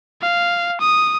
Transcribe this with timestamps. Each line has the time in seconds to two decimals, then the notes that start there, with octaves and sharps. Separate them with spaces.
0.22 F5
0.80 D#6